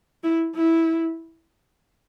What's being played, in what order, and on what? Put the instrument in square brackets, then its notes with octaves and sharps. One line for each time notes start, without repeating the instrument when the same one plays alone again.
[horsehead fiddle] E4
E4